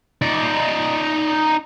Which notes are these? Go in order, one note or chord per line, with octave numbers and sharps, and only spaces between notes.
D#4 D5